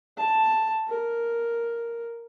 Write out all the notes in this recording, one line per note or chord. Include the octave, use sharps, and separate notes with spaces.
A5
A#4